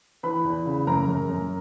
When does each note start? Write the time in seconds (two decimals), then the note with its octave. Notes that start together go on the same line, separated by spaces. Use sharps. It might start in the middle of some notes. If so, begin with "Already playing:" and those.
0.23 E3 B4 B5
0.44 E2
0.66 C#3
0.87 F#2 A#4 A#5
1.08 F#2
1.29 F#2